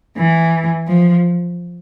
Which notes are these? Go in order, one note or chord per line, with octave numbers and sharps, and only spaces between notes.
E3
F3